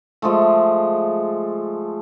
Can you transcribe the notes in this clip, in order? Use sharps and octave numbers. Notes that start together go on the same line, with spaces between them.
F3 G#3 A3